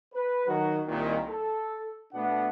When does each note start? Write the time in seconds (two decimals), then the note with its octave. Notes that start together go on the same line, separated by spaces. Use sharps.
0.13 B4
0.47 D#3 F#3 F#4
0.87 C2 A#2 D#3
1.28 A4
2.14 B2 A3 B3 D4 F#5